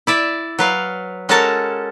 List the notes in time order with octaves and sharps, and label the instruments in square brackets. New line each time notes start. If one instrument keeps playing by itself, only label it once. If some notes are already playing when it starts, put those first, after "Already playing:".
[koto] E4 D5 E5
F#3 B4 F5
G#3 C#4 F#4 A4 A#4 A5